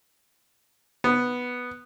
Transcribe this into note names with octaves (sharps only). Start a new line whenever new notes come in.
B3